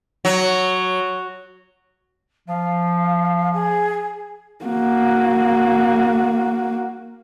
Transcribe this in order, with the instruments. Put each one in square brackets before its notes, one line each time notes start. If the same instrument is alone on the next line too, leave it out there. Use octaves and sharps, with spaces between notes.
[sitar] F#3
[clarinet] F3 [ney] F5
[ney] G#4
[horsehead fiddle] A#3 F#4